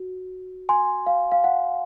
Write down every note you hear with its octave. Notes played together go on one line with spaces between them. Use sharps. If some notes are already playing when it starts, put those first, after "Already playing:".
Already playing: F#4
G#5 C6
F5
F5
F#5